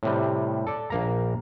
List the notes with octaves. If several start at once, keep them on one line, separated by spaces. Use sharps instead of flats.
A2 C3 G3
A4 D5
A#1 A#3 A#5